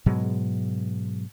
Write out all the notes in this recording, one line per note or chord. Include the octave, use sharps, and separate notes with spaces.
G#2 B2 F#3 G#3